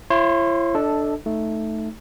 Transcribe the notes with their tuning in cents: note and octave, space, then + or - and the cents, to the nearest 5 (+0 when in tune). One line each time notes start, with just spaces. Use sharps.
E4 +40 C#5 -40 C6 +0
D4 +5 A4 +0 D#5 +35
A3 +0 D#4 +0